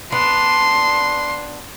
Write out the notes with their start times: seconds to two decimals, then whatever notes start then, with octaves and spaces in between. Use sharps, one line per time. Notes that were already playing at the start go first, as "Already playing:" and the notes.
0.12 B3 D4 C6